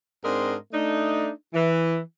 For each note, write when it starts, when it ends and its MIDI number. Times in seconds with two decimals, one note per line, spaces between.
0.24 0.54 44
0.24 0.54 60
0.24 0.54 62
0.24 0.54 70
0.24 0.54 75
0.24 0.54 84
0.73 1.29 57
0.73 1.29 62
0.73 1.29 63
1.54 1.99 52